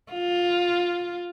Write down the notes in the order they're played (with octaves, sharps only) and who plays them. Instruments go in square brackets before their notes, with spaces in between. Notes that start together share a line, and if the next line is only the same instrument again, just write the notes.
[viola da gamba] F4